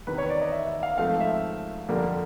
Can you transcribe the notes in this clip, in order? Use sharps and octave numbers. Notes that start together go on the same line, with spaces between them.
E2 C3 D#3 B4
C#5
D5
D#5
E5
E5
F5
G#2 F3 A3 C4 F5
E5
F2 D3 G3 A#3